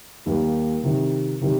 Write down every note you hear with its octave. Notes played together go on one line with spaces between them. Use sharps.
D#2 D#3 G3 A#3
C3 D#3 G3
C3 D#3 G3